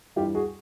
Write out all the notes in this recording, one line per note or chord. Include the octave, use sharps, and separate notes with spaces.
G2 E3 G3 F4 G4
F#4 G#4